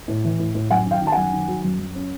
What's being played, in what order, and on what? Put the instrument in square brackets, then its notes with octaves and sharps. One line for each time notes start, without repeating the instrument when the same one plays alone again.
[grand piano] A2
E3
A2
A2
F#2 F#5 G#5
D#3 F5 G5
D#3
A5
F#5 G#5
F#2
D#3
F#3
F#2
F#2
C#4